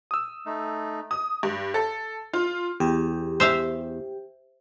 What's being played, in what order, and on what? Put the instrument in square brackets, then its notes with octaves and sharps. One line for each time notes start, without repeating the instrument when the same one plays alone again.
[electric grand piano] D#6 E6
[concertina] A3 D#4
[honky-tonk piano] D#6
G2
A4
F4
[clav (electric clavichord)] E2 [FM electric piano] G4
[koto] C5 E5 F5